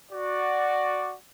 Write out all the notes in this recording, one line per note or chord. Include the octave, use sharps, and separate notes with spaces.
F#4 D5